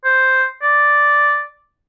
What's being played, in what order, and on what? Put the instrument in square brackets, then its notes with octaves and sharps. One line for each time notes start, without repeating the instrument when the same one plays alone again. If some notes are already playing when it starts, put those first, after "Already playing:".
[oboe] C5
D5